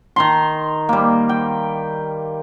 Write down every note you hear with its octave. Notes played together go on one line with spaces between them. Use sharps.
D#3 A#5 C6
G3 A#3
G5